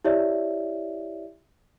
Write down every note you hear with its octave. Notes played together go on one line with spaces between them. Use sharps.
E4 G4 C#5 D5 E5